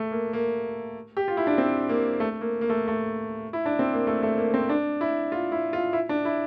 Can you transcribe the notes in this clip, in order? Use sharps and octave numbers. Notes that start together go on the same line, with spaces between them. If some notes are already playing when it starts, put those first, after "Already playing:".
Already playing: A3
A#3
A#3
G4
F4
E4
D4
C4
A#3
A3
A#3
A#3
A3
A3
E4
D4
C4
A#3
A3
A3
A#3
C4
D4
E4
F4
E4
F4
E4
D4
E4